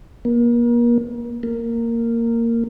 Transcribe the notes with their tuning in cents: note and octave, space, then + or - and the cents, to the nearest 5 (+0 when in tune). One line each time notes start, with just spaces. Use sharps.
A#3 +35
A#3 -10